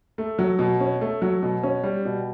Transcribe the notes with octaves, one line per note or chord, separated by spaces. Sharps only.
A3
F#3
B2
C#4
A3
F#3
B2
C#4
G3
B2